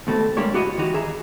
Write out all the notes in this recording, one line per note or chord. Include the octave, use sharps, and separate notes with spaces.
D#2 B2 A3 C4 A4
G3 G#3 A#3 D4 G4 C#5
E4 F#4 G4 C#5 D#5
D#3 E3 D#4 F#4 G4
G#4 E5 A#5